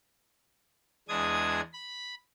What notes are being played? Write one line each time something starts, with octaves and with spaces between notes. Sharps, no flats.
E2 G#3 D4 D#6 G#6
B5